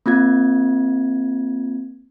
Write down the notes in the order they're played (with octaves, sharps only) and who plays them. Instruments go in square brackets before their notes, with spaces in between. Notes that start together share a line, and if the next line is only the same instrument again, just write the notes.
[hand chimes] A#3 C4 F4 G#6